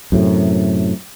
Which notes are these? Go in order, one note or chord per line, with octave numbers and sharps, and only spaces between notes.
F#2 A2 C3